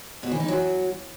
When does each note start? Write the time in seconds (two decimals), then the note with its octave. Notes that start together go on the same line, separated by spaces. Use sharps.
0.23 B2
0.31 E3
0.40 D#4
0.48 F#3